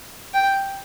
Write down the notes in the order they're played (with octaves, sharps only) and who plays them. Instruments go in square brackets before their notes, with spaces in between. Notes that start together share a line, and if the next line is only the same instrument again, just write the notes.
[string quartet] G5